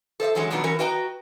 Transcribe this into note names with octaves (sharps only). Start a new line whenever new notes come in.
A4 C5 D#5 E5
D3 E3 F#3 G#3 C#4
F2 B2 D#3 F#3 B3 D4
E3 F#3 C#4 A#4
F#4 B4 D#5 G5 G#5 A#5